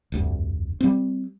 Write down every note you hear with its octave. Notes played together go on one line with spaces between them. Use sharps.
F1 D2 G2
G3 C4